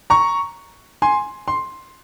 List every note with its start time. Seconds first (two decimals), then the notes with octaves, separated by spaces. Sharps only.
0.10 A#5 C#6
1.02 G#5 C6
1.48 C6